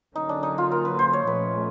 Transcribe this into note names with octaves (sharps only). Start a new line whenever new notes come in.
D3 F#3 A#3 C#4 D#4
D4
D#4
F4
A#4
B4
C5
C#5
A#2 F3 A3 C#4 B4